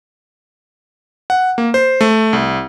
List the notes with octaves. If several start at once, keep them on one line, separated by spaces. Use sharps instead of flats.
F#5
A#3
C5
A3
C2